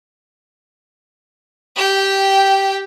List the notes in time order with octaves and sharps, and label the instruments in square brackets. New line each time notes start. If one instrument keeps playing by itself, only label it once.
[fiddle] G4 G5